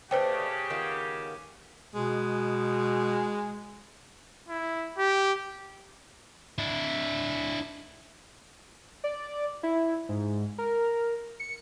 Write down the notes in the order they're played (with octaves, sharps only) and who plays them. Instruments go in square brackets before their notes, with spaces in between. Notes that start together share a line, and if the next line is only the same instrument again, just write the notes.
[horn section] C#3 G4 [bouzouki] A3 D4 [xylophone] B4 C5 G5
[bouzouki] D#3 B3 F4
[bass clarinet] B2 [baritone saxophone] G#3
[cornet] E4
G4
[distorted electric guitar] D4 E4
[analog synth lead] D5
E4
G#2
A#4
C#7